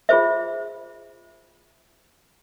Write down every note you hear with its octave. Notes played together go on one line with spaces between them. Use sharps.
F4 G#4 C5 E5